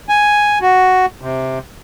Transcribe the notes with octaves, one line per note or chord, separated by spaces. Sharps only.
G#5
F#4
C3